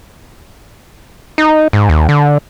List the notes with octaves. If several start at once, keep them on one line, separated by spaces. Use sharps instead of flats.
D#4
G#2
D#2
D3